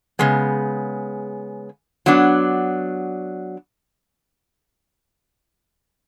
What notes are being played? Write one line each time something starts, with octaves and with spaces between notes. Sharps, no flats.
C#3 G#3 B3
F#3 B3 D4